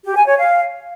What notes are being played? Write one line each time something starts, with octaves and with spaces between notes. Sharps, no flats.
G4
G#5
C#5
F5